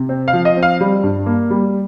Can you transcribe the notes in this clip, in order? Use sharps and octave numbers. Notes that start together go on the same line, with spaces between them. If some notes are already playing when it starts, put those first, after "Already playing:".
Already playing: C3
C4
F5
F3
D#5
C4
F5
G3
G2
A#3
G3